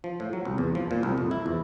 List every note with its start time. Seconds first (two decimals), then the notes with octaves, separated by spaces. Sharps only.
0.04 F3
0.20 A2
0.33 F#3
0.45 C2
0.58 E2
0.75 F3
0.91 A#2
1.03 C2
1.18 F2
1.31 E4
1.46 E2